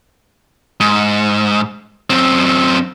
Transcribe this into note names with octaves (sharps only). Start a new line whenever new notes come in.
G#2
F#2 C4